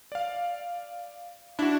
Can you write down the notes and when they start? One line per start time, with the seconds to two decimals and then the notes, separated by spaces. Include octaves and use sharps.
0.12 D5 F5
1.59 D4 E4 F#4